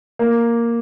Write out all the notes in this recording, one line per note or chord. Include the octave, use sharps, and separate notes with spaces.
A#3